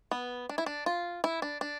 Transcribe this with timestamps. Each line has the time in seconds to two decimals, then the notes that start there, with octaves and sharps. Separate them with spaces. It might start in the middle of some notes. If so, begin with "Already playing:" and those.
0.11 B3
0.49 D4
0.58 E4
0.66 D4
0.86 F4
1.24 E4
1.42 D4
1.61 D4